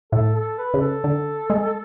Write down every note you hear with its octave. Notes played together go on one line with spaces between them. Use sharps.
A2 A4
A4
B4
C#3
A4
D3
G#3